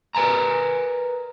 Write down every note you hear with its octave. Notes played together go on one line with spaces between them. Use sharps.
A#4 B4 G#5 A#5